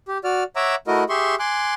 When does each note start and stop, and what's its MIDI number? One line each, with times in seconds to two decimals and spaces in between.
0.08 0.18 67
0.24 0.44 66
0.24 0.44 74
0.24 0.44 89
0.56 0.75 73
0.56 0.75 76
0.56 0.75 78
0.56 0.75 82
0.56 0.75 86
0.56 0.75 88
0.87 1.04 57
0.87 1.04 64
0.87 1.04 66
0.87 1.04 70
0.87 1.04 75
1.09 1.35 67
1.09 1.35 68
1.09 1.35 76
1.09 1.35 84
1.09 1.35 85
1.39 1.74 80
1.39 1.74 84
1.39 1.74 86
1.39 1.74 90